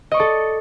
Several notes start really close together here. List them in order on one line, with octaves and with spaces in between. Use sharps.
D#5 C#6 D5 A4